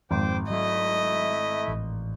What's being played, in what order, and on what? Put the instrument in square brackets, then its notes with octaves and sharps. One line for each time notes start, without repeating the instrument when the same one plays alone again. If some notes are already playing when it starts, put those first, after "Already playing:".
[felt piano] G#1 [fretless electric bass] F2 [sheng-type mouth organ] C5 G5 D6
[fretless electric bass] F#3 [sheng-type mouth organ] A3 E4 [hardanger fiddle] D#5
[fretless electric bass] A1